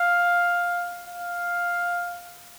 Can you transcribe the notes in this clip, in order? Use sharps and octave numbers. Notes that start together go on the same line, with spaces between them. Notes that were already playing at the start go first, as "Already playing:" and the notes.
Already playing: F5
F5